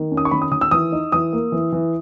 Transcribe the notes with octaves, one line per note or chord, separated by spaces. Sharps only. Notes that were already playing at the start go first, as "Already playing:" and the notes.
Already playing: D#3
C#4
D#6
C#6
D#3 B5
D#6
D#3 D#6
E6
E3 D#6
D#4
E3 D#6
A#3
E3
E3